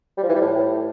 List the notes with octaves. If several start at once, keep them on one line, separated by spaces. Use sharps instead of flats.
G3
F3
E3
G3
A2